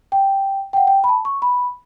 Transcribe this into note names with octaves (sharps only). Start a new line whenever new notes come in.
G5
G5
F#5
G5
B5
A5
C#6
B5